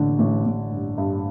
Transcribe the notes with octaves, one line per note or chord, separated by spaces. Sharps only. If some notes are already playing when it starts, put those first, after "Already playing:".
Already playing: A1 D3
A1
A1
G2
G2